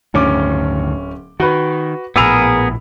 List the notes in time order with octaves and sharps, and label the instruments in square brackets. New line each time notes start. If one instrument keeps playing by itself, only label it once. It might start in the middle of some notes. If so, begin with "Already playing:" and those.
[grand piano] D1 C#4 D6 [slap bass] D2 G2 D#3
[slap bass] D#3 [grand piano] F#4 B4
[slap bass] A#1 A2 [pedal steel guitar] B3 G#4 A#4 [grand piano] B5 E6 F7